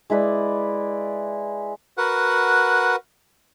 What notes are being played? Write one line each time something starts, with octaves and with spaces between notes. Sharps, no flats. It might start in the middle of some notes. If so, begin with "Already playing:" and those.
G#3 E4 B4 D5
F#4 A#4 B4 F#5